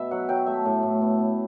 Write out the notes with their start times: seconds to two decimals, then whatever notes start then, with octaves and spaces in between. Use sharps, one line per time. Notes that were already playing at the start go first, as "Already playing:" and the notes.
Already playing: B2 B3 E5
0.11 F#3 F#5
0.29 F#3 G5
0.46 A3 E5
0.65 A2
0.83 A2
1.01 B3
1.19 B3